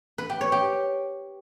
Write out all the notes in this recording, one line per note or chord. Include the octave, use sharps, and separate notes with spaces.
B4
G4
C#5
G4